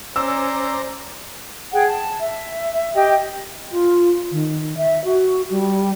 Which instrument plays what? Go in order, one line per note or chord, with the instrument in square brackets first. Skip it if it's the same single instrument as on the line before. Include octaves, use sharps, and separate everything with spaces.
[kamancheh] C#4 [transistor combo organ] C5 D5 A#5 [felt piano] E6
[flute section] G#4 F#5 G5
A5
E5
G4 D#5 G5
[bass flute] F4
D#3
E5
F#4
G3